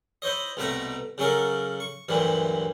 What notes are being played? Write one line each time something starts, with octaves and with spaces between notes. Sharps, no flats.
E4 C5 C#5 D#5
C2 B2 A3 F#5 A#5
C#3 F#3 C#4 A4 A#4
C#6
D2 G2 A#2 E3 F#3